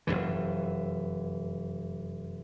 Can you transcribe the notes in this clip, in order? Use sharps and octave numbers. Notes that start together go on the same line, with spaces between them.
F1 C#2 F#2 E3